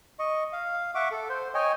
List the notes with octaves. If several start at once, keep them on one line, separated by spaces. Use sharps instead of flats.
D#5 C#6
F5
E5 F#5 C#6 D6
A4
C5
C#5 D#5 G5 G#5